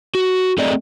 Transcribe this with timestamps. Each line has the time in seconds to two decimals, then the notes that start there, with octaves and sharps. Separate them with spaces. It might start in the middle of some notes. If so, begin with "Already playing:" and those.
0.15 F#4
0.58 A3 C4 G#4 D5 D#5